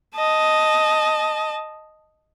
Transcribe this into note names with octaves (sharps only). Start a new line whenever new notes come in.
D#5 A5